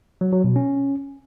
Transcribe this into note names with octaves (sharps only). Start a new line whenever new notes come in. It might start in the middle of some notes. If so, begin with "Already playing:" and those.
F#3
F#3
B2
C#4